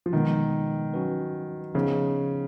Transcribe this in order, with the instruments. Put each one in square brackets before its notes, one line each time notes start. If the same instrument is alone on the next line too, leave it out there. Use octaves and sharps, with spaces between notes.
[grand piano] F3
[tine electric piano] B2 G#3 B3 [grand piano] D#3
[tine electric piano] F#3 C#4 F#4 B4
[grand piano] C#3 [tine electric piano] F3 B3 D#4